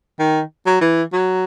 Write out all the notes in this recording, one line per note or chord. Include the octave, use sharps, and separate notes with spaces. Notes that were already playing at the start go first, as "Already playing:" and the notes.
D#3
F#3
E3
F#3